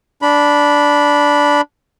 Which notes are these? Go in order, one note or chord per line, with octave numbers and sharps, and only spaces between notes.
D4 B5